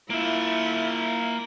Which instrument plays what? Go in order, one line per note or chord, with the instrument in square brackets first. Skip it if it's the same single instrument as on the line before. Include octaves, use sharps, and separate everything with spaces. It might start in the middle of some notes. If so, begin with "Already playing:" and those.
[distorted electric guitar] A#3 E5 [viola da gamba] E4 F4